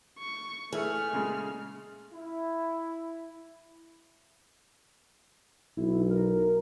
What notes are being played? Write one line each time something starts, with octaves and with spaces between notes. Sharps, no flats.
C#6
E3 A3 G#4 A4 E5 F6
A#2 C#3 G#3
E4
B1 E4
A#4